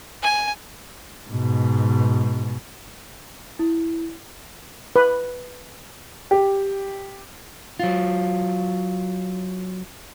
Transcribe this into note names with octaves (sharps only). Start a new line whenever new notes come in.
G#5
G#2 B2
E4
B4
G4
F#3 F4